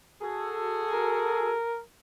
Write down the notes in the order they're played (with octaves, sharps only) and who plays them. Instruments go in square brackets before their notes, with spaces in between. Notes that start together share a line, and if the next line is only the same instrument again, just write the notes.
[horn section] F#4 G#4 A4
[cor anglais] A#4